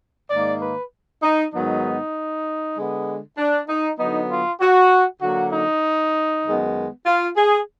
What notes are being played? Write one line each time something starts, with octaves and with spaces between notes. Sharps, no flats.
G#2 D#3 A#3 D5
B4
D#4
G#2 D#3 F#3 B3 D#4
D3 G#3 B3
D4
D#4
D3 F#3 B3 D#4
F4
F#4
D3 F#3 A#3 F#4
D#4
F#2 D#3 G#3 B3
F4
G#4